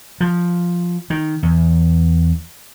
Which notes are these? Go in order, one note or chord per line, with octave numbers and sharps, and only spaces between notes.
F3
D#3
E2